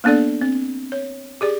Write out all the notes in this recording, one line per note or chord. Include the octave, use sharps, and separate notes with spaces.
A#3 B3 D4 A4 D5
C4
C#5
G4 G#4 D5